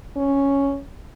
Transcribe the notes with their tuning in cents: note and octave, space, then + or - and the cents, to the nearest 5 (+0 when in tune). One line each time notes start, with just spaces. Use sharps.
C#4 +0